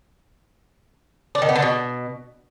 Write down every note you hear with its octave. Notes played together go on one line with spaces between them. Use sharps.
D4
D#3
B3
D3
B2